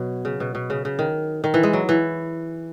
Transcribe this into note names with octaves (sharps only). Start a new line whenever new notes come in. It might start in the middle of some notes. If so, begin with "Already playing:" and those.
Already playing: B2 F#3
C#3
B2
B2
C#3
C#3
D#3
D#3
E3
G#3
F#3
E3